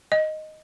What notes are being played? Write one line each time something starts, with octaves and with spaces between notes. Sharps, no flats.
D#5